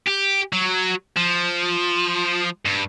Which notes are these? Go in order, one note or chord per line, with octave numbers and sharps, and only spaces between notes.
G4
F#3
F3
G2